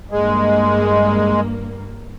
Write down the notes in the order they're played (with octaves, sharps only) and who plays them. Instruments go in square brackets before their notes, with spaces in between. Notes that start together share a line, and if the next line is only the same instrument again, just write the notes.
[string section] G2 A#3 [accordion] G#3